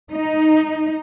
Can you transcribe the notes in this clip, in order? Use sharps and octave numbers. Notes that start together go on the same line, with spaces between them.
D#4